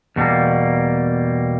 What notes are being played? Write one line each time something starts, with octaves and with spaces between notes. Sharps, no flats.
E2 B2 G3 A#3